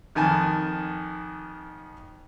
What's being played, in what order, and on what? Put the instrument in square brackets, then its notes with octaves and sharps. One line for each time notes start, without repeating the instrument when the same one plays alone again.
[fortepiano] F2 D#3 G#5 A5